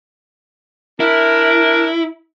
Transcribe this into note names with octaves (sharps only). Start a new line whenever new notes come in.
D4 E4 A#4